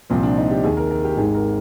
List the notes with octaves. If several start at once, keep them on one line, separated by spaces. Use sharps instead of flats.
C2 A#2 F3 C4
D4
D#4
G4
D#2 D#3 G#4
A#4
A#4
G4
G#1 G#2 D#3 G#4
A#4